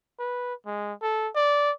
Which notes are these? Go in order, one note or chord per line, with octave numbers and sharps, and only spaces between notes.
B4
G#3
A4
D5